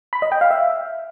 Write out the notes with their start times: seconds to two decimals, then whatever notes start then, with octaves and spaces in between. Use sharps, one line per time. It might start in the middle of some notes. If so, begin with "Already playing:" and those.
0.13 B5
0.22 D#5
0.32 G5
0.41 F5
0.51 E5